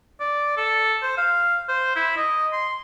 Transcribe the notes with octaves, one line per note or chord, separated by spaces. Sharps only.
D5
A4
C5
F5
C5
E4
D#5
C6